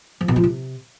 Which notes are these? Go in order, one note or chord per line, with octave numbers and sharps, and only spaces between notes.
F3
B2
F3
C3